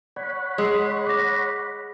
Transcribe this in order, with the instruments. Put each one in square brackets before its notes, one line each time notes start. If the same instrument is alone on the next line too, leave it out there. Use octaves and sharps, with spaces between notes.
[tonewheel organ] C#5 F#5 B5 [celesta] D5
[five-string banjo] G#3 [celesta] G#4 E6 C7
[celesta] D6 A#6